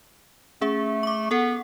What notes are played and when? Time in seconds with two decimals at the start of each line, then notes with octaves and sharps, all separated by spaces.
0.61 A3 C#4 G#4 E5
1.03 C#6 D6
1.31 B3 A4 F#5